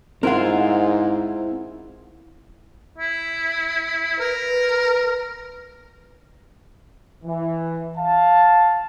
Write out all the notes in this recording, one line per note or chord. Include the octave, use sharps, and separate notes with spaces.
G#2 C4 E4 F4 A#4 F#5
E4
A#4 B4
E3
F5 A5